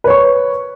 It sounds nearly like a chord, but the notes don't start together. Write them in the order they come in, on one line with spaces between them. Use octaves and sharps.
B4 C#5 C#6